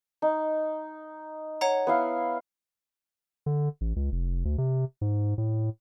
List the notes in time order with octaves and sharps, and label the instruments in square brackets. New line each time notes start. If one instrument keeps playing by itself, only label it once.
[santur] D#4
[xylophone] C#5 F#5 A#5
[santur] B3 E4 F5
[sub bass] D3
A1
C#2
F1
D2
C3
G#2
A2